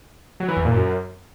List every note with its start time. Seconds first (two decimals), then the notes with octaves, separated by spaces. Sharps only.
0.40 F#3
0.48 E3
0.57 E2
0.65 A#2
0.73 F#2